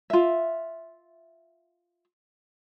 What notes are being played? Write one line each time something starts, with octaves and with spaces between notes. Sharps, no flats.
F4 E5